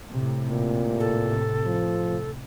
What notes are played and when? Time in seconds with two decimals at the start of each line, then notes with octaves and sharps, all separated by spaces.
0.13 A2 C3
0.50 A#2
1.00 A4
1.66 F3